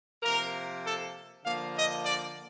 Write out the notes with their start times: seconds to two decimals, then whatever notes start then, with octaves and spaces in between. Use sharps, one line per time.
0.22 C3 F3 A#3 A#4
0.83 A4
1.43 D3 F3 A#3 F5
1.74 D#5
2.04 D5